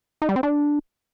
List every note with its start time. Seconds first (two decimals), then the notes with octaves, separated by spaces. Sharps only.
0.22 D#4
0.29 G3
0.36 C4
0.43 D4